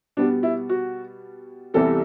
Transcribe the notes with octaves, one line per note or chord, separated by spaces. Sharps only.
B2 G3 B3 D4
E4
F#4
C2 C3 E3 G3 B3 A4